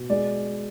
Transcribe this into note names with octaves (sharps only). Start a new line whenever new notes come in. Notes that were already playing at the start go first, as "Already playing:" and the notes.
Already playing: B2
G#3 D5